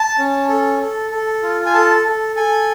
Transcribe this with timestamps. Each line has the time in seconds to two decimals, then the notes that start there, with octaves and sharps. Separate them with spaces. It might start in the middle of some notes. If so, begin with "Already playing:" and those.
Already playing: A5
0.18 C#4
0.49 A4
0.81 A4
1.11 A4
1.43 F4
1.66 G#5
1.74 A4 A5
2.05 A4
2.36 A4 G#5